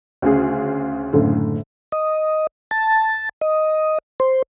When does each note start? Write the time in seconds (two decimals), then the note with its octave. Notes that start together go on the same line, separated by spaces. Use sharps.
0.22 D2 C#3 G#4
1.13 F#1 A2 D3
1.92 D#5
2.71 A5
3.41 D#5
4.20 C5